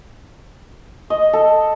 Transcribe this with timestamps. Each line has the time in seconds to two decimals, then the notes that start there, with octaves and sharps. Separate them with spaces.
1.10 D#5
1.33 A4